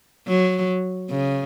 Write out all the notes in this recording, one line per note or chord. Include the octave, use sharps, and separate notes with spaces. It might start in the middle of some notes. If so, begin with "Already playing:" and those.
F#3
C#3